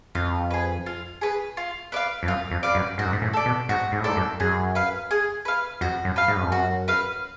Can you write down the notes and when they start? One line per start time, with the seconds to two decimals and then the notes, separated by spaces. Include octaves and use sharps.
0.15 F2 F4
0.51 G#4 B4
0.86 F4
1.21 G#4 B4
1.57 F4
1.92 B4 D5 F5
2.23 F2
2.28 F#2 F4
2.51 F2
2.63 B4 D5 F5
2.75 F#2
2.98 G#2 F#4
3.05 F#2
3.13 G#2
3.22 A2
3.33 A4 D5
3.45 B2
3.69 G#2 F#4
3.92 G#2
4.00 A2
4.04 G#2 A4 D5
4.16 F#2
4.40 F#2 G#4
4.75 B4 F5
5.11 G#4
5.45 B4 F5
5.81 F2 F#4
6.05 F#2
6.16 B4 F5
6.28 G#2
6.36 F#2
6.43 F2
6.50 F#2 F#4
6.88 B4 F5